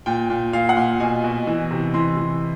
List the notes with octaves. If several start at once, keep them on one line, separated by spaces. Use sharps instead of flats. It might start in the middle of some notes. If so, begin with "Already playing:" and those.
A#2 G5
A#2
A#2 F5
F#5
A#2
B2 G#5
B2
E3
C3
E3 C6
E3